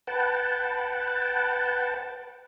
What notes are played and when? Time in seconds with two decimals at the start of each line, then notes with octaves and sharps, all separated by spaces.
0.07 B4 F#5 G5 A5